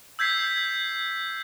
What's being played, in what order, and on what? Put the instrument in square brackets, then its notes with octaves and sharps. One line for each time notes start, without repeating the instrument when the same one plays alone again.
[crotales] E6 G6 G#6 B6 C7